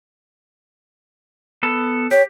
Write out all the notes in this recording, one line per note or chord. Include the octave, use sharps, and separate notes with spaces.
B3 A4
G4 C#5